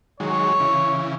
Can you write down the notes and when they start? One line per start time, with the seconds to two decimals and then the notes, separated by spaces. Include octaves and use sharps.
0.20 D#3 F#3 G#3 C#5
0.60 C#3 E3